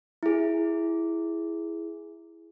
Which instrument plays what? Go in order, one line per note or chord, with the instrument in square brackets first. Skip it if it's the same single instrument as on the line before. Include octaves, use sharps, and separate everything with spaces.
[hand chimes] E4 G#4